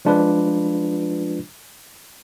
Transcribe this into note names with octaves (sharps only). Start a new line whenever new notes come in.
F3 G#3 D4 F4 B4